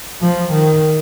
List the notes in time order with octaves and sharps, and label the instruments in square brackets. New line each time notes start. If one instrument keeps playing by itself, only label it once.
[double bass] F3
D#3